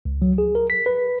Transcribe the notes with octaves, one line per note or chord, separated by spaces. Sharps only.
C#2
F#3
G#4
A#4
B6
B4